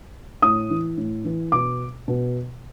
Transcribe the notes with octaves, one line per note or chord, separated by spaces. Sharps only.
A2 D#6
E3
A2
E3
B2 D6
B2